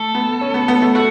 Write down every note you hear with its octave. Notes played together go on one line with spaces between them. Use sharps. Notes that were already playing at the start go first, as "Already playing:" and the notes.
Already playing: A3 A4
B3
C#4
B3
B3
A3
A3 F#4